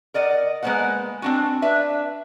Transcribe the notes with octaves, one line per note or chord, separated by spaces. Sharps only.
A#4 D5 D#5 F#5
G#3 A#3 B3 D4 C5 F#5
C4 D4 F#4
D4 B4 E5